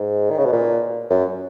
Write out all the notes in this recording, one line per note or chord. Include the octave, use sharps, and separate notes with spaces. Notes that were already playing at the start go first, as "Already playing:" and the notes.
Already playing: G#2
D#3
C#3
B2
A#2
F#2